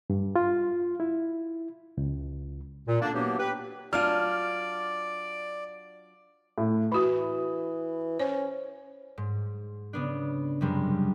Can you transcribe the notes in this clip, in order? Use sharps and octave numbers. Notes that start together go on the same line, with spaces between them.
G2
F4
E4
C#2
A#2
D3 A#3 D4
E3 F#3 A#3 B3 D4 G4
G4 B4
F#3 D4 F4 D5 F6
A2
E3 E4 F#4 B5 D#6
C#4 C5
G#2
C#3 B3 D4
F#2 C3 G3 G#3